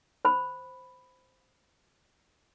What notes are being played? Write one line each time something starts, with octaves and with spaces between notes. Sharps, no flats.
C5 B5